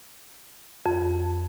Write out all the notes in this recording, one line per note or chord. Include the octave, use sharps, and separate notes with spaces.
F2